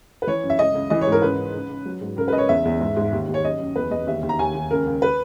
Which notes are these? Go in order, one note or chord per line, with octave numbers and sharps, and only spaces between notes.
B4
E3 C#5
F#2
E5
C#2 D#5
C#2
E3 D#5
C#5
G#2
A#4
C#2 B4
C#2
C#2
C#2
F#3
G#2
C#2 A#4
B4
C#2 D#5
C#5
E2 E5
E2
G#2
G#2
D#2
D#2
C#5
F#2 D#5
F#2
E2 B4
E2 D#5
D#2 E5
D#2
A#5
D#2 G#5
D#2
C#2 A#4
C#2
B4